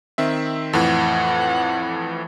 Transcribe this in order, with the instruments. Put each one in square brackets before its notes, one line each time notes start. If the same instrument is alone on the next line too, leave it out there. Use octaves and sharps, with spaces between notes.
[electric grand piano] D#3 C4 E5
[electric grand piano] F2 A2 E3 [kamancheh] F#5